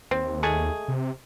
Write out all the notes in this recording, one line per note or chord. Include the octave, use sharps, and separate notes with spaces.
D#2 C4
G#3 A3 G#4
C3